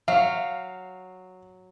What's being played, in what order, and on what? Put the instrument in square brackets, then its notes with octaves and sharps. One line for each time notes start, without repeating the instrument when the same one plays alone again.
[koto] F#3 [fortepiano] F5